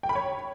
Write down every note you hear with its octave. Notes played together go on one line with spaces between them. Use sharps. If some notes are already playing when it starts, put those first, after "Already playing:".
G5
B5
C#5